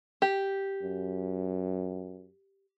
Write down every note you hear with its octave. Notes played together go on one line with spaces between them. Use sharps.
G4
F#2